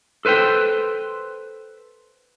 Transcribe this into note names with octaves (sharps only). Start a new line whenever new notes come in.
A4 B4 C5 F5 G5